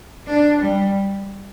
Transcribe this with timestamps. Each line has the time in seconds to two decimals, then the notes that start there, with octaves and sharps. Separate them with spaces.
0.27 D4
0.61 G3